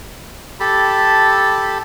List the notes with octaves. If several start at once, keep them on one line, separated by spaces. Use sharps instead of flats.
G4 A4 A5 B5